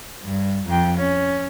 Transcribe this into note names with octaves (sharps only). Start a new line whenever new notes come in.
G2
F2 G5
C#4